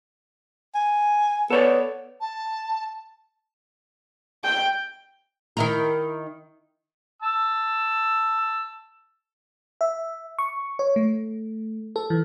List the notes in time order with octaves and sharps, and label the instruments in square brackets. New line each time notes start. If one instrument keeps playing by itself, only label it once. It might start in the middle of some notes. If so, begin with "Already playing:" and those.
[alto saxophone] G#5
[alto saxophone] B3 [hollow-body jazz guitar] A4 C#5 D5
[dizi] A5
[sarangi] G5
[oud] D#3 E4 A#4
[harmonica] A5 E6
[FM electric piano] E5
C#6
C#5
A3
A4
E3